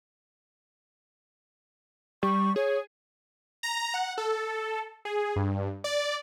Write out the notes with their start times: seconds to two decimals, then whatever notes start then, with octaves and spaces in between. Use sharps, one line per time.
2.23 G3 C#6
2.56 G#4 C#5
3.63 A#5
3.94 F#5
4.18 A4
5.05 G#4
5.36 G2
5.84 D5